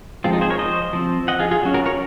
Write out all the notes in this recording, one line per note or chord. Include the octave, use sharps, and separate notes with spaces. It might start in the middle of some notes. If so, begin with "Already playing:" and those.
F3 G#3 C4 F4
D#4
G#4 C5
A#4 C#5
C5 D#5
F3 C4
D#5 F#5
F4 G#4
F4 G#4
F#3 C#4
F#4 A#4
A#4 C#5